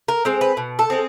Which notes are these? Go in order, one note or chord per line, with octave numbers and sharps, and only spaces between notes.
A#4
G#3 C4 C5
B4
B2
A4
G#3 C4